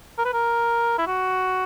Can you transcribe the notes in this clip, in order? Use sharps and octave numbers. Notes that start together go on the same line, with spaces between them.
A#4
B4
A#4
E4
F#4